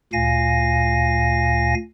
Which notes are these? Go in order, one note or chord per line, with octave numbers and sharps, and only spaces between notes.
D2 A#2 F5 G#5 A#6